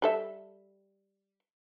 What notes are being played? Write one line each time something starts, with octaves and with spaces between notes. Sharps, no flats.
G3 A4 E5